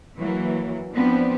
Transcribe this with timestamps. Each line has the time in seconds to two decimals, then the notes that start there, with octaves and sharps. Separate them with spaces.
0.18 E3 F#3 A#3
0.93 F3 B3 C4 D4